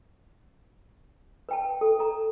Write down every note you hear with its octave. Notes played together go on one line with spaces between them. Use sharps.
B4 G5 A5
A4
A4 A#5